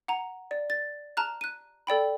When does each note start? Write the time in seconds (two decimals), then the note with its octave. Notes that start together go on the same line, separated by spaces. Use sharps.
0.08 F#5 A#5
0.51 D5
0.70 A6
1.17 A5 A#5 F6 F#6
1.41 F#6 D#7
1.87 A4 D5 G5 B5